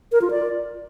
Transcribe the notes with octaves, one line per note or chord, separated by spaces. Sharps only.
A#4
F4
D5